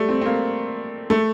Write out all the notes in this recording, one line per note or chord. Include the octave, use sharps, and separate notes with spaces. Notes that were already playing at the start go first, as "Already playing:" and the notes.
Already playing: G3 A3
C4
C4
A#3
A3